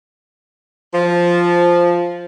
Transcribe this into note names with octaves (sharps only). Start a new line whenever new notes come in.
F3